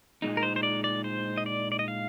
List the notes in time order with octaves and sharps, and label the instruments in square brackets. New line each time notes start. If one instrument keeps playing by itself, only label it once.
[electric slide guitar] A#2 G#3 D#4
[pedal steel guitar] A#4
C5
C5
D5
D5
C5
D#5
D5
D5
D#5
F5